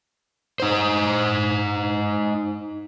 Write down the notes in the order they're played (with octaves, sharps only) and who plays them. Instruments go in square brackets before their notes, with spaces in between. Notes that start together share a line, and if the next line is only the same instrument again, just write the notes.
[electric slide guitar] D#4 C5